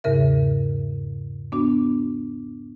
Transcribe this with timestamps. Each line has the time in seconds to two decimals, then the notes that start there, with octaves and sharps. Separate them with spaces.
0.04 E2 G#2 C#3 A#4 E5
1.52 B3 D4 F#4